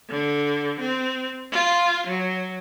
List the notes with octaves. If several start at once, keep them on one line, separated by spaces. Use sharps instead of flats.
D3
C4
F4
F#3